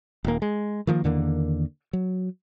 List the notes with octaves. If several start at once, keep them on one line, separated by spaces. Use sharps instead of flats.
D#1 A#3
G#3
D#3 F3 A3 A#3
E2 D3 D#3 A#3
F#3